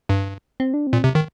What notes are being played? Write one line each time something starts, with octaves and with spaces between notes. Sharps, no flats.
G2
C4
D4
C4
A#2
C3
D#3